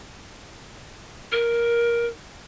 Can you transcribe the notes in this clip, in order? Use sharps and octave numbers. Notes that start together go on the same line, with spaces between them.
A#4